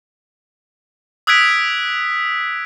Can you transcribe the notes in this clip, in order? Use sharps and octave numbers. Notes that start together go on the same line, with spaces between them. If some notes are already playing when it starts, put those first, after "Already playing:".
D#6 E6 F#6 G#6 B6 D7